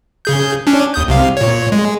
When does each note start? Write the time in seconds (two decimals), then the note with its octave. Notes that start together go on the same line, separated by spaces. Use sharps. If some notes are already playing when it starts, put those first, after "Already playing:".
0.25 C#3 G#4 G6
0.67 C#4 D4
0.94 D#2 D#6 G6
1.08 C2 C3 F5
1.37 A#2 C#5
1.72 G#3